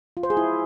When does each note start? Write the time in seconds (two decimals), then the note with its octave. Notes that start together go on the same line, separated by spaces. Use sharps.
0.17 F4
0.23 C5
0.30 G#4
0.37 E4